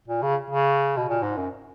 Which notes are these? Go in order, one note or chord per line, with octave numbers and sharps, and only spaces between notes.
A#2
C#3
C#3
B2
A#2
G#2
F#2